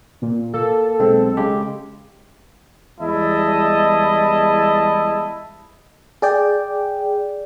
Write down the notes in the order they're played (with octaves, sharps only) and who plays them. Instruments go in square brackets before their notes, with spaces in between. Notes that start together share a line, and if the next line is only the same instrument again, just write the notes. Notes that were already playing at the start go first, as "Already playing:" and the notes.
[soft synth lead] A#2
[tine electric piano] A#3 [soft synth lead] A4
[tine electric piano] B1 G#3 C4
C#3 G#3 G4
[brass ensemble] E2 G3 G#3 E4 D#5 A5
[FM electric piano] G#4 D5 G5